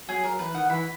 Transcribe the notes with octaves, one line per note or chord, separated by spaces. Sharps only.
F#3 G#4
F#3 A#4
E3 B4
D#3 F#5
E3 B5